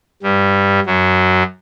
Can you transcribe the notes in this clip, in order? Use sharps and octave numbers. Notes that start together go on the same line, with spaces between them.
G2 G3
F#2 F#3